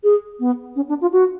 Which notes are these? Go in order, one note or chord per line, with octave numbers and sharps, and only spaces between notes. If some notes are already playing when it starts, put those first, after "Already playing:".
G#4
B3
C#4
D4
F4
F#4